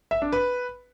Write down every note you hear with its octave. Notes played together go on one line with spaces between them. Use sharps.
E5
D4
B4